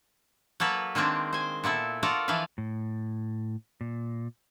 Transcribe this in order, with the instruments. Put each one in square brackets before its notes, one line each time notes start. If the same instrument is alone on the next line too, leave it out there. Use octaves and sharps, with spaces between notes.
[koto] F#3 A#3 A4 B4
D#3 G#3 A#3 C4 D4
C5 G#5
A#2 B3 E4 A4
F4 F#4 A4 A#4 D5
E3 F3 B4 F5
[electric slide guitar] A2
A#2